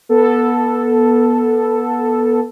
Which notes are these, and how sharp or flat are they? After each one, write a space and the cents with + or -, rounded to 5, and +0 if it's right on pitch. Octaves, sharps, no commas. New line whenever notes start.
B3 -25 A4 +0